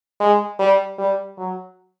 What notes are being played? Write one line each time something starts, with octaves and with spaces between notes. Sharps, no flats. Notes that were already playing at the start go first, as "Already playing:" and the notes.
G#3
G3
G3
F#3